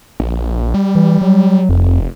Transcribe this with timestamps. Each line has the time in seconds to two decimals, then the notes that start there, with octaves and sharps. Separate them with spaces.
0.20 A#1
0.74 G3
0.95 E3
1.21 F#3
1.69 F1 F2